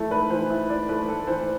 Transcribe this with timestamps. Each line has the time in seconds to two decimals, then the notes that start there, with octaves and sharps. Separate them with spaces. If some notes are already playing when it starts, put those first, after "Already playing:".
Already playing: E3 A3 E4
0.11 G#2 B4
0.30 E3 C5
0.50 E4
0.69 G#2 D5
0.89 A3 B4
1.08 A3 A4
1.27 E3 C5